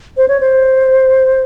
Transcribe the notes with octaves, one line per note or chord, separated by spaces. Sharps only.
C5
C#5
C5